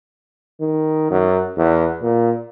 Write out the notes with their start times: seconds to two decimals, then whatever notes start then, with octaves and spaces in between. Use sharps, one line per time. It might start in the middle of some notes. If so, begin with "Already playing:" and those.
0.61 D#3
1.11 F#2
1.57 E2
2.02 A#2